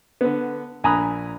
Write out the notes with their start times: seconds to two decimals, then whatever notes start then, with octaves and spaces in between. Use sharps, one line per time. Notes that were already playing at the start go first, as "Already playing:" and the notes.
0.21 D3 B3
0.84 A#1 G#5 A#5 B5 D#6 F#6